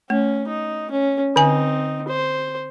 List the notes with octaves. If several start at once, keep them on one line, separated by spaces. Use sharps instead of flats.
A3 C#4
D#4
C#4
D3 C4 D#4 G#5
C5